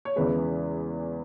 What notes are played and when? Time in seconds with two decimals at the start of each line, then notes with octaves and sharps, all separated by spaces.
0.05 C#5
0.16 E2 C#3 E3 G#3 B4